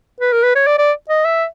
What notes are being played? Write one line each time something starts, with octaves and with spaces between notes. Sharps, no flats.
B4
A#4
B4
C#5
D5
D5
D#5
E5